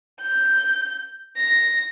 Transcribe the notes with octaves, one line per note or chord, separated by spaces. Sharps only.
G6
A#6